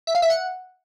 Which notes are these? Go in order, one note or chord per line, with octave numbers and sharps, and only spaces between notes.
E5
F5
E5
F#5